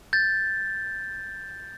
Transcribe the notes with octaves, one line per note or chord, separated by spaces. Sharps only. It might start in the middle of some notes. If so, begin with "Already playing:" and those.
G6 A6